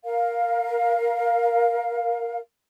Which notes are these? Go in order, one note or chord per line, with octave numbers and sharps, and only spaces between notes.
A#4 F5